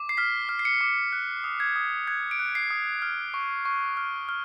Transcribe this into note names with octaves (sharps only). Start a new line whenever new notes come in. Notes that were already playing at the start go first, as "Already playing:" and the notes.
Already playing: D6
C7
F6 B6
F6
C7
C#7
D6
F#6
D#6
G#6
D#6
F#6 G#6
D7
F#6
C7
D#6
F6
C#6
C#6
F6
F6